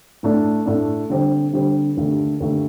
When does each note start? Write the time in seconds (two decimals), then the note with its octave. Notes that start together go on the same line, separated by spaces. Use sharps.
0.23 A2 A3 D4
0.66 A2 A3 D4
1.10 D3 G3 C4 G4
1.53 D3 G3 C4 G4
1.97 D#2 D3 A3
2.40 D#2 D3 A3